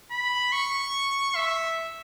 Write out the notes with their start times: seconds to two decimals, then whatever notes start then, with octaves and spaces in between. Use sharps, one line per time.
0.11 B5
0.52 C#6
1.36 E5